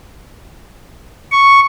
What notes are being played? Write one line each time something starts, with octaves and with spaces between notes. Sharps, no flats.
C#6